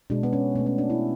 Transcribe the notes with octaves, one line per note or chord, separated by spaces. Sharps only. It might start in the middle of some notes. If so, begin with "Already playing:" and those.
B2 G#3 D4
B3
C#4
B2 A3 B3
C#4
D4
E4